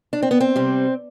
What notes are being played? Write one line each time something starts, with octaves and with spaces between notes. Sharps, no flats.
D4
C4
B3
C4
C3 G3